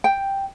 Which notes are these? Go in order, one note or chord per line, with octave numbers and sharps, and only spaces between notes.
G5